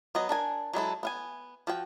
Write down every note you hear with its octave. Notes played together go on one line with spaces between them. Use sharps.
F#3 B3 D#5
D4 A#4 G#5
F#3 G#3 E4 A4
B3 F5 G#5
F3 F#4 G5